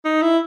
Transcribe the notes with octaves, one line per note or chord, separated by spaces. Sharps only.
D#4
E4